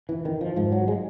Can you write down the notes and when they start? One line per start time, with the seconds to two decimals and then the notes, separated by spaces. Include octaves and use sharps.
0.09 E3
0.25 D#3
0.41 F3
0.56 G#2 F3
0.72 F#3
0.88 G#3